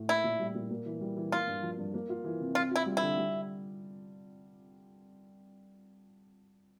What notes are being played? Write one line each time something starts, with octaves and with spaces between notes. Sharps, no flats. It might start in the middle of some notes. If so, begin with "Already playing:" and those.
Already playing: A2
A#3 E4
A#2
G3
A#2
A#3
E3
G3
E3
A#3 F4
G2
F3
G2
A#3
F4
E3
C3
C4 F4
E4 F4
G3
E4
D3
G3